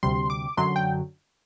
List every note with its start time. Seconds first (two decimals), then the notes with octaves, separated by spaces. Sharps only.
0.03 D2 C3 G3 C6
0.30 D6
0.57 F#2 D3 F#3 C6
0.76 G5